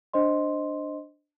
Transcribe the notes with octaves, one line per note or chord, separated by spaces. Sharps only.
D4 C5 D#5 C6